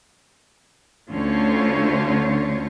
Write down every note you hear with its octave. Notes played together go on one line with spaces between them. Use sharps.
D2 D3 C#4 F4 C5 C#5